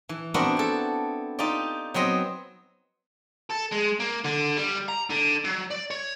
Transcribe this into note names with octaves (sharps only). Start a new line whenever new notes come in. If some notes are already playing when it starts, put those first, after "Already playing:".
E3
B3 C4 D4 E4 F#4 A#4
E4 A4
D#4 F4 G4 D5
F#3 B3 C4 D#5
A4
G#3
A#3
D3
G3
A#5
D3
F#3
D5
C#5